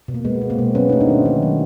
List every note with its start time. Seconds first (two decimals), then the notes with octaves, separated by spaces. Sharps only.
0.08 B2
0.14 A#3
0.25 G#3 B3
0.41 G#3
0.50 A#3 C4
0.59 B2
0.75 F#3 B3 C#4
0.89 A3 D#4
1.00 C4 D4
1.09 D#3
1.25 D#3
1.42 F#3